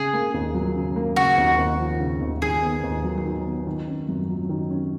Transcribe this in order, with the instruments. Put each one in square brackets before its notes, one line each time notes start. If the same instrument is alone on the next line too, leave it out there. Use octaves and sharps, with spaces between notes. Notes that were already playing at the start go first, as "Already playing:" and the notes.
Already playing: [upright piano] C#3 [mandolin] G#4
[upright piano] A#3
D#2
F#3
C#3
A#3
[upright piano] C#3 [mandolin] F#4
[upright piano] D#2
D#2
F3
C#3
D#2
[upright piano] D#3 [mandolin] G#4
[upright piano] B3
D#2
F#3
D#3
B3
D#3
C#4
F#2
F#3
D#3
C#4